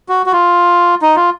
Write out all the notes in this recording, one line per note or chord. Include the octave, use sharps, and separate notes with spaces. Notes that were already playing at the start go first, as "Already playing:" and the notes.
F#4
F#4
F4
D#4
F4